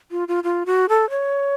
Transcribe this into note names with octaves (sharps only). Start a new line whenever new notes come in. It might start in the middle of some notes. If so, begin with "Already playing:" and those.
F4
F4
F4
F#4
A4
C#5